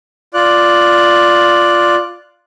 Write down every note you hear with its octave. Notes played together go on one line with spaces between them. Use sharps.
F4 D5 F#6